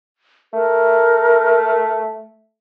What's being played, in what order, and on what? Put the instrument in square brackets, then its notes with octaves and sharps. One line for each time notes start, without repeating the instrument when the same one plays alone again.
[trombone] A3 [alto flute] A#4